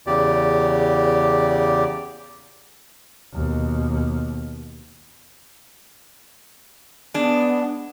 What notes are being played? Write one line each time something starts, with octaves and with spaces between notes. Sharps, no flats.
E2 C#3 G4 D5
D#2 B2
G#3 B3 D4